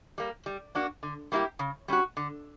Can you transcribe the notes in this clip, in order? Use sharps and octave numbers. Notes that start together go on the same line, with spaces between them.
G3 A#3
G3
A#3 D4 F#4
D3
G3 A#3 E4 G4
C#3
G3 C#4 F#4
D3